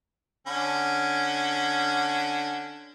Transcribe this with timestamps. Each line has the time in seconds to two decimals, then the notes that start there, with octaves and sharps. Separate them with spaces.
0.47 D3 C#4